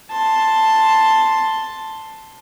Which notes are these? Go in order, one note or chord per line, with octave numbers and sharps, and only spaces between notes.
A5 C6